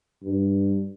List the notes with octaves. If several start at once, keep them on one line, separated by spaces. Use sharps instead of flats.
G2